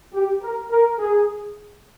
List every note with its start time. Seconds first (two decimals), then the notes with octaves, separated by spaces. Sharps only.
0.14 G4
0.42 A#4
0.71 A#4
0.98 G#4